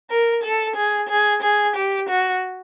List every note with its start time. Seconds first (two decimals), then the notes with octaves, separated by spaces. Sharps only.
0.10 A#4
0.43 A4
0.76 G#4
1.09 G#4
1.43 G#4
1.76 G4
2.09 F#4